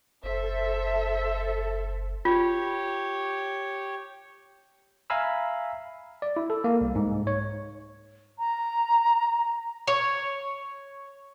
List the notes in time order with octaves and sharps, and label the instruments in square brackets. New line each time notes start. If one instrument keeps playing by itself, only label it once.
[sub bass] F#1 [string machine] A4 [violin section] C5 E5
[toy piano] F4 [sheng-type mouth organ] G4 C#5
[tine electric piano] E5 F5 G#5 A#5 B5 E6
D5
E4
A4
A#3
C2
G#2
C#5
[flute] A#5
[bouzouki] C#5